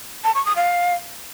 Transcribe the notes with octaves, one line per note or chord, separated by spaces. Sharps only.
A5
C#6
D#6
F5